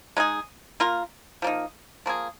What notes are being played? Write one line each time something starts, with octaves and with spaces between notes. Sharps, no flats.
G#3 D#4 G#4
A#3 F4 A#4
F3 A#3 D#4
F3 A#3 G#4